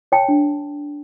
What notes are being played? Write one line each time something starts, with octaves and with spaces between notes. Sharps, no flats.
C#5 G5 A5
D4